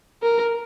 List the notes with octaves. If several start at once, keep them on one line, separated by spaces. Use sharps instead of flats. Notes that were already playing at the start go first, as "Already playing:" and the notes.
A#4